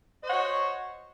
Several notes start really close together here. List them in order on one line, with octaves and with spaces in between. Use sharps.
D#5 C5 C#5 F#5 F#4